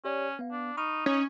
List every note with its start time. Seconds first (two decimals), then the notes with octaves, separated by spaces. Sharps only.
0.05 C#4 G4 C#5 D5
0.39 B3 F5
0.51 D4
0.77 D#4 B5 C#6 F6
1.06 C#4 D#4